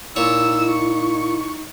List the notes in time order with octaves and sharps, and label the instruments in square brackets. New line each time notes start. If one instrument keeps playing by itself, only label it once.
[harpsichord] A#2 C#5 [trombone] D#4 [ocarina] E4 [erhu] E6
[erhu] C#6